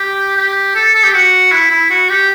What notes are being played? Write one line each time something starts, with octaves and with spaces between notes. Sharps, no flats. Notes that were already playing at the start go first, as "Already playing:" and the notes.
Already playing: G4
G4
A4
A4
G4
F#4
E4
E4
F#4
G4